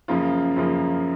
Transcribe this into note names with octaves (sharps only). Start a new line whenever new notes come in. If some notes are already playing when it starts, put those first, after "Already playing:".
F#2 C#3 F3 A#3 F4
F#2 C#3 F3 A#3 F4